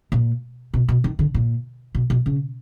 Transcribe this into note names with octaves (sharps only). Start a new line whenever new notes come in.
A#2
B2
B2
D#3
D3
A#2
B2
B2
C#3